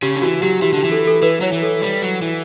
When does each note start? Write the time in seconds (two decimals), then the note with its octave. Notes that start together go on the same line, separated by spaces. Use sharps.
0.02 C#3 G4
0.16 D3
0.22 E3 F#4
0.43 F#3 G4
0.62 E3 G4
0.73 D3 G4
0.84 E3
0.92 A4
1.07 A4
1.22 E3 B4
1.41 F#3 C#5
1.52 E3
1.63 A4
1.82 G3
2.02 F#3
2.22 E3